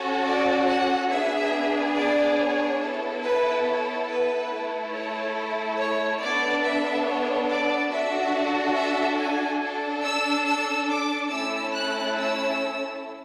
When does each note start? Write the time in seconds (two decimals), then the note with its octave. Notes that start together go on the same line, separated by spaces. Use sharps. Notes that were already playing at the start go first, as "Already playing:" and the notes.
Already playing: C#4 F#4 A4
0.24 D5
0.67 F#5
1.10 B3 D4 G#4 E5
1.95 D5
2.38 C#5
2.80 B3 E4 A4
3.23 B4
3.65 C#5
4.08 B4
4.50 A3 E4 A4
4.93 C#5
5.78 C#5
6.20 B3 D4 A4 D5
6.63 E5
7.05 C#5
7.48 D5
7.90 D4 F#4 A4 E5
8.76 E5
9.18 G#5
9.61 D4 A4
10.04 E6
10.46 E6
10.89 D6
11.31 A3 C#4 E4 A4 E6
11.73 F#6
12.17 E6